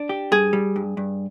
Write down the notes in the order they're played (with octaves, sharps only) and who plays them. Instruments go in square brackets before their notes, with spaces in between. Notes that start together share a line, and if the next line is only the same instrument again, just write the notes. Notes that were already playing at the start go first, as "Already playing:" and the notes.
Already playing: [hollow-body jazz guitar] D4
G4
[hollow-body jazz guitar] G2 [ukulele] G#4
[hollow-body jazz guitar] G3
G2
G2